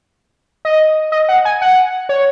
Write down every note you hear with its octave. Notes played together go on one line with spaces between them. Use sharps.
D#5
D#5
F#5
G#5
F#5
C#5